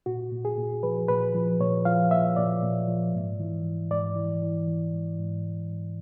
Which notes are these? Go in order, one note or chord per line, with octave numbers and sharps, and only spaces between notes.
A#2 F#4
A#2
G#4
A#2
F3 B4
A#2 B4
F3
A#2 C#5
F3 F5
A#2 E5
A#2 D5
A#2
F3
G#2
E3
G#2
G#2 D5
E3
E3
E3
G#2
G#2
G#2
G#2